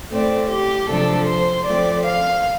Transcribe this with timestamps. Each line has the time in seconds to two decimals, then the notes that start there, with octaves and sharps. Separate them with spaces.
0.12 A2 A3 C4 D5
0.50 G4
0.89 C3 F3 A3 D4 A4
1.28 C5
1.67 F3 A3 C4 D5
2.06 F5